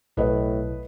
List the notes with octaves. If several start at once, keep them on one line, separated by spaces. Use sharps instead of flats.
B1 A2 B4 D#5